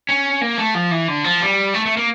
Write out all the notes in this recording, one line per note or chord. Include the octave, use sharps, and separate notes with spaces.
C#4
A#3
A3
F3
E3
D3
F3
G3
A3
A3
A#3